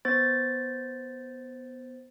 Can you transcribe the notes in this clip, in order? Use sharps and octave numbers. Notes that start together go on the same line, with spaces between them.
B3 C5 A6